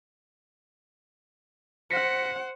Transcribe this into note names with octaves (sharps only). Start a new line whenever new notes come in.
C5 F#5 A#6 B6 C#7